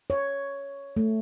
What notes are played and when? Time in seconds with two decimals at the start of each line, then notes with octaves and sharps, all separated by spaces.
0.10 C#5
0.97 A3